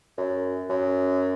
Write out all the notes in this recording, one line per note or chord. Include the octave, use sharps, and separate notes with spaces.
F#2
F#2